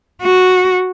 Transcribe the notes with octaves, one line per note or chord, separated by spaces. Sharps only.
F#4